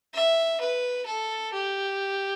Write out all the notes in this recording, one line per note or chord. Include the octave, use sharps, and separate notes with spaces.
E5
B4
A4
G4